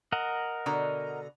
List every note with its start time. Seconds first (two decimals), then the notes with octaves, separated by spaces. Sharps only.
0.12 A#4 D#5 F#5
0.66 B2 D3 A#5